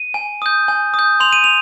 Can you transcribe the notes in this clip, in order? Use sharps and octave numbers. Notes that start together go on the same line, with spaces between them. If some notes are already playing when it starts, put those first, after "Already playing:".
Already playing: D#7
G#5
D#6 G6
G#5
D#6
G6
C6 F7
D#7
F7